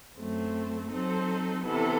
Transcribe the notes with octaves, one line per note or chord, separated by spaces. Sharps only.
F#2 F#3 A3 C4
F#3 C4 D#4 A4 C5
C3 E3 B3 E4 A4